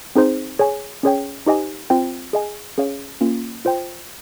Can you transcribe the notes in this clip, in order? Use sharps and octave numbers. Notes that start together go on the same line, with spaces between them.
C4 D#4 G#4 C5
G#4 C#5 G#5
C#4 G#4 C#5 G5
D#4 G4 C5 D#5 G#5
C4 F4 C5 G5
G#4 D#5 G#5
C#4 G#4 C#5 F5
A#3 C#4 F4
F4 C5 G5